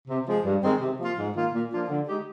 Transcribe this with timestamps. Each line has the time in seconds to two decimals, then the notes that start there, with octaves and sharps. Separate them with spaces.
0.08 C3
0.26 F3 G#3
0.44 G2
0.62 D#3 G#3 C4
0.81 C3
0.99 F3 A#3 F4
1.18 G#2
1.35 D#3 A#3 F4
1.53 A#2
1.71 F3 A#3 D4 F4
1.89 D3
2.07 G#3 D#4 G4